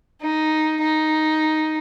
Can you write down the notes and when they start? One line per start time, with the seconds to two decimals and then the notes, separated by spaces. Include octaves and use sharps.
0.21 D#4
0.81 D#4